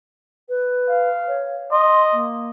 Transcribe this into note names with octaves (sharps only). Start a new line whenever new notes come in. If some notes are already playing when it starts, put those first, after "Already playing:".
B4
F5
C#5
D#5 C6
A#3